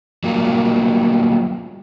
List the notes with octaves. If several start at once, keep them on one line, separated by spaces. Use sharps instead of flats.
F#3 G3 A#3 F4